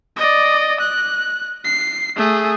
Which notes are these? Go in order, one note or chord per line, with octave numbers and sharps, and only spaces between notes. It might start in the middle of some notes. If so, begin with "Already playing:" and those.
D5 D#5
F#6
C7
A3 G#4